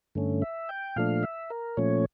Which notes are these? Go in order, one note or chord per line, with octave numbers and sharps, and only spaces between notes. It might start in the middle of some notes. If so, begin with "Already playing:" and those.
G2 D3 A3 C#4
E5
G5
A#2 F3 A3 D4 F5
E5
A#4
A#2 F3 A3 C#4 C#5